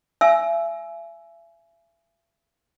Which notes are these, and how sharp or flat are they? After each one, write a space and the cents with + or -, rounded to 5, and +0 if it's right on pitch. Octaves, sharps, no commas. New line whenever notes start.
E5 +35 G#5 +20 E6 +0